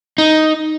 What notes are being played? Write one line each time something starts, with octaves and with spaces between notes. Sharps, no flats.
D#4